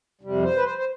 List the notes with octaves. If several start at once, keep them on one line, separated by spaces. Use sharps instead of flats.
F2 C3 G3
C5
B4
C5
C5